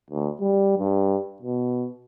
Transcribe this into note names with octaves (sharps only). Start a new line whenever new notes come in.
D2
G3
G2
B2